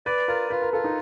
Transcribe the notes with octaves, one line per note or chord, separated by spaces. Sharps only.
B4 D5
F4 A#4
F4 B4
A#4
F4 A4
D#4